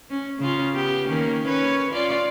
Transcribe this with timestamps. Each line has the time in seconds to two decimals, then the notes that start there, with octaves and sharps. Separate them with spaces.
0.10 C#4
0.39 C#3 C#4 F4
0.74 B3 G4
1.08 D#3 A#3 C#4
1.48 C#4 B4 C#5
1.91 C#4 F4 D5